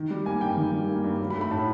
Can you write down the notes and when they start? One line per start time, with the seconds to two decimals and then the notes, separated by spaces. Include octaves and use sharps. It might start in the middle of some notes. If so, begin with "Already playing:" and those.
Already playing: D#3
0.11 G3
0.26 A#3 G#5
0.41 G2 G5
0.57 D#3
0.73 G3
0.89 A#3
1.04 G2
1.20 F#3
1.30 B5
1.36 A3
1.41 B5
1.51 A2 A5